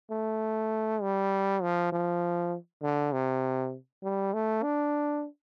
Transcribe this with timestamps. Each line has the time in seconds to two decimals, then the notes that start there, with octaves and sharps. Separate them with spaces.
0.11 A3
1.02 G3
1.62 F3
1.92 F3
2.82 D3
3.12 C3
4.03 G3
4.33 A3
4.63 D4